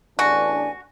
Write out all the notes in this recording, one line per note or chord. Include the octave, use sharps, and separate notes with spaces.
A1 E2 D4 F#4 G#5